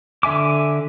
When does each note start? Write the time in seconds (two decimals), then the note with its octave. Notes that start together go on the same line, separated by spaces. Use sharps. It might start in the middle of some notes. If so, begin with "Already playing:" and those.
0.23 D3 E5 G#5 D6